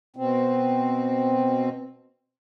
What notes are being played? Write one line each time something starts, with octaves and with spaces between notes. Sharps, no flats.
B2 C4